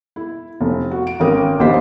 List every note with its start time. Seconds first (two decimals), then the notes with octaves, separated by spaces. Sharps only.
0.16 E4
0.61 F1
0.91 F#4
1.07 D7
1.20 G#1 C#4 A#4 G5 D#6
1.59 A#1 D#2 C5 D#5 B6